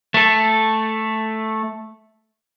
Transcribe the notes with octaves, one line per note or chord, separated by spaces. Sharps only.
A3 A4